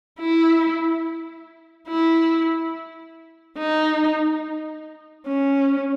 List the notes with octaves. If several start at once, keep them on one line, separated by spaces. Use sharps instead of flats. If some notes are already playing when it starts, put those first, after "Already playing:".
E4
E4
D#4
C#4